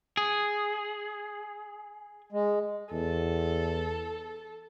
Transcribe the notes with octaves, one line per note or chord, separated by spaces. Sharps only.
G#4
G#3
E2 A4